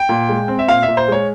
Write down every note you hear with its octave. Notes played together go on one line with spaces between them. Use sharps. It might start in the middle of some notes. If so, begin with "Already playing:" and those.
Already playing: G5
A#2
G#3
C4
E5
A#2 F5
E5
A#2
C5
G#3 C#5